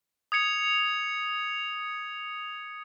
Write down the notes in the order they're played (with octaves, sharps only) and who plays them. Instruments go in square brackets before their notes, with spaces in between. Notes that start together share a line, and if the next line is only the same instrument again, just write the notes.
[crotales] D#6 G#6 C#7 F7